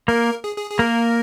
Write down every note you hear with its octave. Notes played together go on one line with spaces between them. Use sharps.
A#3 A#4
G#4
G#4
G#4
A#3 A#4